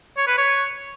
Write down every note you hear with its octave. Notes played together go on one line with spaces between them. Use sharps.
C#5
B4
C#5